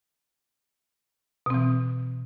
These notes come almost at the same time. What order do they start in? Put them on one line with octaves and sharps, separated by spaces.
B2 C4 E3